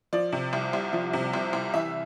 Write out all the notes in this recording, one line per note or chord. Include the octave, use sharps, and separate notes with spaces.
F3 D5
C3
C2
C2
F3
C3
C2
C2
E3 E5